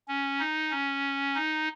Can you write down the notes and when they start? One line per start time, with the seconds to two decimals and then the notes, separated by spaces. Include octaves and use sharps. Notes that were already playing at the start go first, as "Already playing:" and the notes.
0.08 C#4
0.40 D#4
0.71 C#4
1.35 D#4